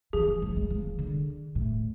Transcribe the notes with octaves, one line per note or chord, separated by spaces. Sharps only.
E3 G#4
F3
F3
G#3
F3
D3
A2